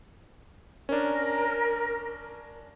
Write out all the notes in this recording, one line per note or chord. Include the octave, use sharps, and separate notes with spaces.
C#4 D4 A#4